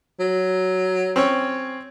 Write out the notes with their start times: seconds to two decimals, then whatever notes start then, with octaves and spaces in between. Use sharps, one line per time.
0.20 F#3
1.16 C4 C#4 C#5